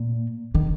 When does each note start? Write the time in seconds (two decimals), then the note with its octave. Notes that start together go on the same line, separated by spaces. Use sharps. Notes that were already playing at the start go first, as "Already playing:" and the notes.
Already playing: A#2
0.55 D#3